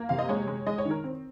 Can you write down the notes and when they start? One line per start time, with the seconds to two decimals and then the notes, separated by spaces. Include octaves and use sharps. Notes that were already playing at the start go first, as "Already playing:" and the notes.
Already playing: A#3
0.09 C3 F5
0.19 D#5
0.29 G#3 C#5
0.47 G#3
0.67 G#3 D#5
0.78 C#5
0.85 D#3
0.90 A#4
1.04 C4